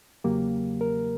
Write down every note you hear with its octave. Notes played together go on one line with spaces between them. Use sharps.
E2 C#3 F#3 A#3 G4
A#4